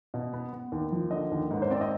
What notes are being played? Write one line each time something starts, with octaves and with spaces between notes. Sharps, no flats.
B2
B3
B3
D#2
F3
D3 D#5
D#2
G#2 B4
C5
C4 D5
D#5